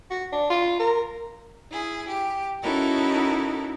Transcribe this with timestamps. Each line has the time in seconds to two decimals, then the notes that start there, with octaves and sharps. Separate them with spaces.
0.11 F#4
0.32 D4
0.50 F4
0.79 A#4
1.71 E4 G#4
2.09 G4
2.62 C#4 D#4 E4 F#4 A4 A#4